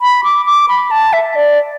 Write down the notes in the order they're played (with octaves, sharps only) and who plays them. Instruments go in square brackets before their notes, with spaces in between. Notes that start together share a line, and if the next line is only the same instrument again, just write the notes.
[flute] B5
D6
D6
B5
A5
E5
D5